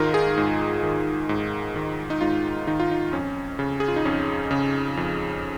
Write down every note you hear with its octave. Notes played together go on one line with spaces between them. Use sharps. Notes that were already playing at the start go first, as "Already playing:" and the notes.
Already playing: G#2 D#3 D#4 F4 A#4
G#4
G#2
D#3
G#2
D#3
D#4
G#2 F4
D#3 D#4
F4
D#4
F2 C#4
C#3
G#4
F4
D#4
F2 C#4
C#3
F2